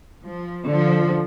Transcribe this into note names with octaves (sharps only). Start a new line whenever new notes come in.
F3
D3 F3